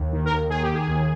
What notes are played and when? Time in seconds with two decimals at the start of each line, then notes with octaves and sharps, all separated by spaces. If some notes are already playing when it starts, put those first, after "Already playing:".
Already playing: D#2
0.12 D#3
0.25 A#4
0.31 D#2
0.49 D#3 G#4
0.63 G4
0.68 D#3
0.75 G#4
0.87 D#2